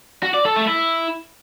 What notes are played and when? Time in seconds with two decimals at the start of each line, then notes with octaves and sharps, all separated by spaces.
0.23 F#4
0.34 D5
0.45 A4
0.56 A3
0.68 E4